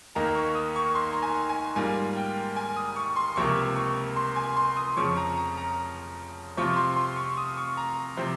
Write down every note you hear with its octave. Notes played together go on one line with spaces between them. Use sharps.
D#2 D#3 A#3 D#4 A#5
C#6
D#6
C#6
C6
A#5
G#5
G#5
G#2 G3 A#3 F4 G#5
G5
G#5
D#6
C#6
C6
C#2 C3 F3 A#3 C#6
C#6
C6
G#5
C6
D#6
F2 C#3 F3 C#6
A#5
A#5
A#5
C3 F3 C4 F4 C#6
C6
C6
C#6
D#6
C#6
A#5
C3 F3 C4 C5